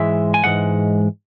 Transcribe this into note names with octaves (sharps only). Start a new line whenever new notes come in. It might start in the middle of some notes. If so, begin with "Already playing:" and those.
Already playing: G#2 E3 G#3 E5
G#5
G#2 E3 G#3 F#5